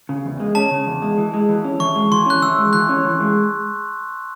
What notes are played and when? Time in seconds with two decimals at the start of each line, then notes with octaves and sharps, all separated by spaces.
0.09 C#3
0.25 E2
0.40 G#3
0.55 C#4 A5
0.71 C#3
0.87 E2
1.02 G#3
1.18 E3
1.34 G#3
1.49 E3
1.64 C#4
1.80 E3 C#6
1.96 G#3
2.11 E3 C6
2.26 C#4 F#6
2.42 E3 E6
2.58 G#3
2.73 E3 F#6
2.89 C#4
3.05 E3
3.21 G#3